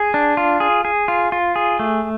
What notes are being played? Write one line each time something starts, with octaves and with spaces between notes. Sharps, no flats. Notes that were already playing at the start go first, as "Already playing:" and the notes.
Already playing: G#4
D4
F4
G#4
G#4
F4
F4
G#4
A3